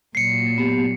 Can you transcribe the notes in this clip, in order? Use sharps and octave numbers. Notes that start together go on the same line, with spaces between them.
A#2 F#3 C7 C#7
B3 G4